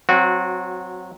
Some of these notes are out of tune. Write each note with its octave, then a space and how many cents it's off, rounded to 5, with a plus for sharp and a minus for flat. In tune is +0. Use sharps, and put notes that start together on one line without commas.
F#3 +0 C4 +0 F#4 -25